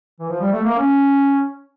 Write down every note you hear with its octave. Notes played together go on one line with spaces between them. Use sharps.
E3
F3
G3
A3
A#3
C#4